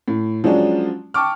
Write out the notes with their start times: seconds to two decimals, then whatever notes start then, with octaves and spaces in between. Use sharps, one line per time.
0.08 A2
0.44 F3 F#3 G#3 C#4 D4
1.14 G5 A5 C#6 D6 F6